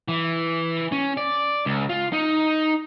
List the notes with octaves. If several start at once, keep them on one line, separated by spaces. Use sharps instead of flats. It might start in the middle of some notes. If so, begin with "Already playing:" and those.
E3
C#4
D5
C#2
F4
D#4